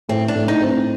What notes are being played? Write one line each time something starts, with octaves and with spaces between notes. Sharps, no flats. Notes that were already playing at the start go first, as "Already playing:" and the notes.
A2 C4
D4
A2
D#4
C4